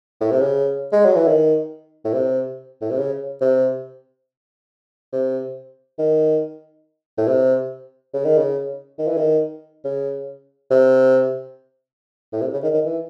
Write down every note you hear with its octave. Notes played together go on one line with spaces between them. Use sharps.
A2
C3
C#3
G#3
F#3
E3
D#3
A2
C3
A2
C3
C#3
C3
C3
D#3
A2
C3
C#3
D#3
C#3
D#3
E3
D#3
C#3
C3
A2
C3
C#3
D#3
D#3
E3